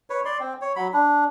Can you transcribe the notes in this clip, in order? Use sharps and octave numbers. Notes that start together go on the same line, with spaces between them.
B4 C#5
D5 C6
C4
C#5
F#3 B5
D4